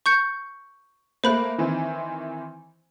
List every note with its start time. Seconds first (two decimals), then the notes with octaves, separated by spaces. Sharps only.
0.06 C#6 G6 C#7
1.24 A3 A#3 C5 B5 F#6
1.58 D#3 E3 C4